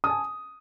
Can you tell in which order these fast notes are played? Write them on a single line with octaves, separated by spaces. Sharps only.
D#6 A5 G#5